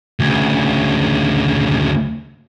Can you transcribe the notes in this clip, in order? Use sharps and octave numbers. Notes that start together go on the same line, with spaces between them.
D2 C#3